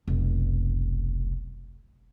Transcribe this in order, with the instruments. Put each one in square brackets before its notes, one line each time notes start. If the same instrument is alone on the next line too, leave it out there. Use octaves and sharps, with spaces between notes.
[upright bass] F1 B1